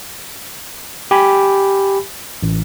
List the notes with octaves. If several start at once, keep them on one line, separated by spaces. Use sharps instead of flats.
G4 G#5 B5
A1